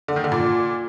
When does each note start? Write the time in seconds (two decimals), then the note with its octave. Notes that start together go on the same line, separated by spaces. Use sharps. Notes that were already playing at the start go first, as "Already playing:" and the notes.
0.08 D3
0.16 D#3
0.24 D3
0.32 A#2